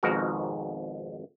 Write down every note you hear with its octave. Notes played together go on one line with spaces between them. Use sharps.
G#1 F2 G#2 B2 F#4 A#4